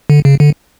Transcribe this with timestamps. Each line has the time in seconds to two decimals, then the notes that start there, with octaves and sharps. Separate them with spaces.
0.10 D3
0.25 C#3
0.40 D3